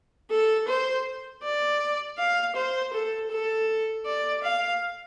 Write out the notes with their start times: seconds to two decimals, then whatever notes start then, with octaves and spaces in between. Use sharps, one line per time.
0.30 A4
0.68 C5
1.43 D5
2.18 F5
2.56 C5
2.93 A4
3.30 A4
4.05 D5
4.43 F5